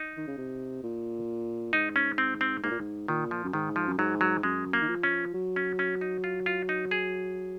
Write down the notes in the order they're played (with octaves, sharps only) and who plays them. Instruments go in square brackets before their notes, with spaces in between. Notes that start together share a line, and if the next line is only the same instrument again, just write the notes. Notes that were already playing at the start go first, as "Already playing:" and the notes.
Already playing: [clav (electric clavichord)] D#4
[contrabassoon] D#3
C#3
C3
A#2
[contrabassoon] G#2 [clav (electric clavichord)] D#4
[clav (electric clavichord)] C#4
C4
C4
[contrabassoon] G#2 [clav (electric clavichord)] A#3
[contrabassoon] A#2
G#2
[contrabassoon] A#2 [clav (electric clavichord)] D#3
[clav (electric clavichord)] F3
[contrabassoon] F#2
[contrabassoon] G#2 [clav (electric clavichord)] D#3
[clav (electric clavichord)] F3
[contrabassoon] F#2
[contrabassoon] G#2 [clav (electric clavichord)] F#3
[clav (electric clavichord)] F#3
[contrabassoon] F#2 [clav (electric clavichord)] G#3
[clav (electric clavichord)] A#3
[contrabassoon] D#3
F3
[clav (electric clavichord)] C#4
[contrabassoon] F#3
[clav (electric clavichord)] C#4
C#4
D#4
F4
F4
D#4
G#4